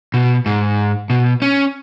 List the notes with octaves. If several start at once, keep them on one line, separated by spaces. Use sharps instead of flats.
B2
G#2
B2
C#4